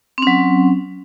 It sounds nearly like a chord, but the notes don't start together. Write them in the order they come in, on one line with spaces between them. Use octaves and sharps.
C4 C#4 F#3